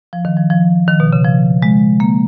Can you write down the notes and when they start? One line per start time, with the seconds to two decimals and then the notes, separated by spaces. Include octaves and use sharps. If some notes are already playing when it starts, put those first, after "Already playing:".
0.13 F3
0.25 D#3
0.37 F3
0.50 F3
0.88 D#3
1.00 B2
1.07 D#3
1.13 C#3
1.25 F3
1.63 G#3
2.00 A#3